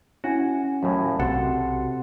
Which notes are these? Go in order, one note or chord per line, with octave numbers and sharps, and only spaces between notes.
C#4 E4 F#4 F#5 G#5
D#2 A2 F#3 G#5
B1 C3 F#4 A4 F#5 C6